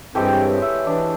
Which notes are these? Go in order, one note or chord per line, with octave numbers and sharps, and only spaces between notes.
G2 E3 G#3 C4 G4 A4 G5
C#5
E5
E3 D4